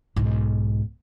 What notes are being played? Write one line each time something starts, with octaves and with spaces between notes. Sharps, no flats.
B1 G#2